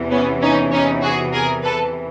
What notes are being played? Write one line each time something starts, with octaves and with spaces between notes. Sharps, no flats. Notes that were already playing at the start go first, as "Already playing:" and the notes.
Already playing: E2 C3 E3
B3 C#4
C#4 D#4
C#4 D#4
F#4 G#4
G#4 A#4
A4 B4